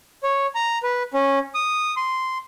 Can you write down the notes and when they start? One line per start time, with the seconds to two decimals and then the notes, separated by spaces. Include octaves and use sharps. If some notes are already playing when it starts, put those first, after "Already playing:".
0.23 C#5
0.55 A#5
0.83 B4
1.14 C#4
1.55 D#6
1.97 C6